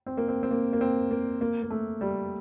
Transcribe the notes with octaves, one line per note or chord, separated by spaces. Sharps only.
C4
A#3
C4
C4
A#3
A#3
C4
A#3
A#3
A#3
A3
G3